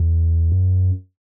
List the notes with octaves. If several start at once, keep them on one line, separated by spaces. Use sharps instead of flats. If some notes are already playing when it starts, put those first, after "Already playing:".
Already playing: E2
F#2